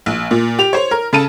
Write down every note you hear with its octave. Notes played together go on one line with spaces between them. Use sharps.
A#1
A#2
G4 F7
C5 C#5
A#4
C#3 A4 A5 D#7